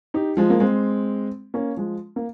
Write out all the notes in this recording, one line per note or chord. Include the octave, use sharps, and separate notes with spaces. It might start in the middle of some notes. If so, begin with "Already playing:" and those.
D#4 G4
F3 G#3
A#3
G#3 C4
A#3 C#4
F3 G#3
A#3